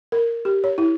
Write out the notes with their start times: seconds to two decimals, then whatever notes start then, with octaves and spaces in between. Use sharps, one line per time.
0.12 A#4
0.45 G4
0.64 C#5
0.78 E4